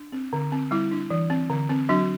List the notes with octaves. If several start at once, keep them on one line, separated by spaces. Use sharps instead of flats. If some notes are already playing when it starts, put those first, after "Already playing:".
Already playing: D4
C4
D3
C4
G3 E4
D4
E3
C4
D3
C4
F#3 D4 F#4